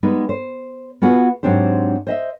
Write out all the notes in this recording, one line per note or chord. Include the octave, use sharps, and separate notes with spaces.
G3 G#3 B3 D#4 B4
C5
B3 F4 F#4 G#4 B4
G#2 F#3 C4 D4 G4 C5
C5 D#5 E5